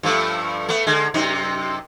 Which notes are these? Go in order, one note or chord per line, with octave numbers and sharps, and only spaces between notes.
G2 F3 A3
A3 B3
D3 G#3
F#2 C3 D#4